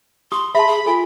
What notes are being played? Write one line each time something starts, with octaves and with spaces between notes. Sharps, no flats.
G4 C6 D#6
G#4 E5 A5 B5
G#4
F4 A4 G#5